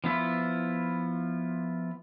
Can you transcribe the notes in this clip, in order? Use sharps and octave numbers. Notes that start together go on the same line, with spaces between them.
F3 B3 E4 F4